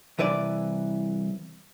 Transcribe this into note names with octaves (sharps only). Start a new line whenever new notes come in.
C2 E3 B4 D5